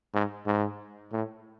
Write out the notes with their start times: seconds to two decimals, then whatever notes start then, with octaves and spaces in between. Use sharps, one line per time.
0.14 G#2
0.46 G#2
1.12 A2